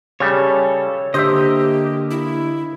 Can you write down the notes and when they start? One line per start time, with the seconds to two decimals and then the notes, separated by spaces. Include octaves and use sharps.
0.20 C#3 G3 A4 C#5
1.14 D3 A#3 G4 C5 D#5 E5
2.11 E4